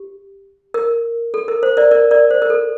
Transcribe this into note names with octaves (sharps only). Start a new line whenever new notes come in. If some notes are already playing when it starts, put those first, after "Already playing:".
Already playing: G4
A#4
A4
A#4
C5
A#4 D5
A#4 D5
A#4 D5
C5
A#4
A4